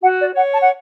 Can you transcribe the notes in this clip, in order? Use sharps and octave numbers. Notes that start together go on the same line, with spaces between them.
F#4 F#5
D5
C#5 F#5
A5
F#5